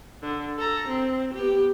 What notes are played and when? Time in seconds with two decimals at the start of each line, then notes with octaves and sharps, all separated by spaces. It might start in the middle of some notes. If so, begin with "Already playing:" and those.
0.22 D3
0.58 A4 A#5
0.88 C4
1.34 B3 G4